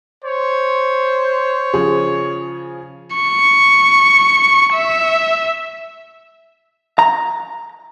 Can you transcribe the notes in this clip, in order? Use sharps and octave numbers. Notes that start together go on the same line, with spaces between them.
C5 C#5
C#3 F3 G#4
C#6
E5
A#5